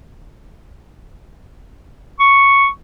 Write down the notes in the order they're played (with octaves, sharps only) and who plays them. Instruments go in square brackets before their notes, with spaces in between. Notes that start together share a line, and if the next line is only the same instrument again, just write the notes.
[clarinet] C#6